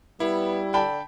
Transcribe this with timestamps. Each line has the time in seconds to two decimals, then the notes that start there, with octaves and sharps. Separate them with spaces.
0.20 G3 B3 E4
0.74 D3 G5 A5 B5